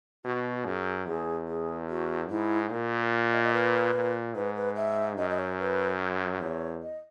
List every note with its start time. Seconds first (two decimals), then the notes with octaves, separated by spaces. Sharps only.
0.25 B2 F#4
0.66 F#2 G#4
1.07 E2 G#4
1.48 G#4
1.90 F#4
2.30 G#2 E4
2.71 A#2 A#4
3.32 D#5
3.44 D#5
3.53 B4
3.95 A#2
4.35 G#2 B4
4.56 B4
4.76 E5
5.18 F#2 D#5
5.30 D#5
5.39 C#5
5.59 B4
6.40 E2 C#5
6.83 D#5